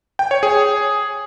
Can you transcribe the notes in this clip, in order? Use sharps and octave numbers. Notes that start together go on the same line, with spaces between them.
G5
C#5
G#4